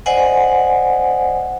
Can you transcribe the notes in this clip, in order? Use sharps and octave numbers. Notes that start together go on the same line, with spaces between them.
C5 D5 D#5 F#5 G#5